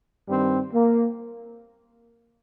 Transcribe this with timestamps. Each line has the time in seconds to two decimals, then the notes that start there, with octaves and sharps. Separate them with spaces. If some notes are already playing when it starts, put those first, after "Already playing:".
0.27 G2 D#3 G3 C4
0.74 A#3